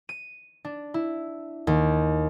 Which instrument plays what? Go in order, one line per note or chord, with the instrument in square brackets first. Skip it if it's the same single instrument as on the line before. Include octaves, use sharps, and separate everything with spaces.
[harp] D#7
D4
E4
D#2